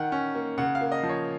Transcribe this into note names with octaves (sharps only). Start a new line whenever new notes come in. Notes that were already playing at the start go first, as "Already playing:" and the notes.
Already playing: D#3 F#5
C#4
A#3
C#3 F#5
F5
A#3
D#5
F3
C#5